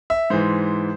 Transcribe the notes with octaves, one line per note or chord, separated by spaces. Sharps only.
E5
G#2 E3 C5